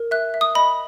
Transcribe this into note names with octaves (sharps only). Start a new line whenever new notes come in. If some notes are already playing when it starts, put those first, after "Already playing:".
Already playing: A#4
E5 F#6
E5
D#6
D#5 B5